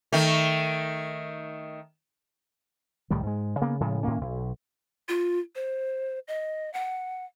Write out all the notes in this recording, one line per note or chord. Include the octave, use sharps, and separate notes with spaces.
D#3 A3
C2 A2 D#3 G3
G#2 G#3
C#3 A#3 B3
A2 C#3 F3 G#3
A2 D#3 A#3 C#4
B1
F4
C5
D#5
F#5